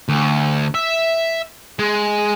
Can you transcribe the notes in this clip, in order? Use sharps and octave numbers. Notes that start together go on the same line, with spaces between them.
D2
E5
G#3